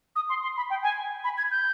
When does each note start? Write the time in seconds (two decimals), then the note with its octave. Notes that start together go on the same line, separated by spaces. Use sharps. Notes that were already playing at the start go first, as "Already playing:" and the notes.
0.16 D#6
0.29 C6
0.43 C6
0.57 B5
0.70 G5
0.83 G#5
1.24 B5
1.38 G#6
1.51 G6